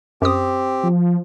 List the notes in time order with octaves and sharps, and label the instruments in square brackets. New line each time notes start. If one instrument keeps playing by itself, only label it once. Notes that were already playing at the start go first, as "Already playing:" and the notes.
[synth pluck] F#2 D#6 [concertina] C4 G4
[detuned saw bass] F3